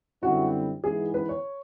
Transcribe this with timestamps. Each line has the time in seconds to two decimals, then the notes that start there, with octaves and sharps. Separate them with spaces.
0.22 F#2 D3 G3 C4 E4 F#4
0.83 G#2 E3 G#3 B3 E4 G#4
1.14 B4
1.29 C#5